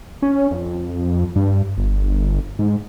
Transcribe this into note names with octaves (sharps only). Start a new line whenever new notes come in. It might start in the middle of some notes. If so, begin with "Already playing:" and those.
C#4
F2
G2
G1
G#2